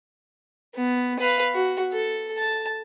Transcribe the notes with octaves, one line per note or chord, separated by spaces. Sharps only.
B3
B4 F5
F#4
A4
A5